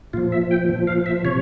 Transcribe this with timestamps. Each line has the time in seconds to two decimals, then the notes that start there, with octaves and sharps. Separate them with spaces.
0.13 A#2 F3 F4
0.32 E5
0.51 G5
0.69 A#2 F3
0.87 F5
1.06 E5
1.25 C3 F3 C#5